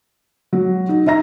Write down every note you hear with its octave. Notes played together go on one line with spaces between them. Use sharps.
F#3
D#4
D#4 E5 A#5 A#6